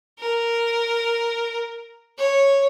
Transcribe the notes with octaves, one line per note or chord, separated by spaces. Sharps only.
A#4
C#5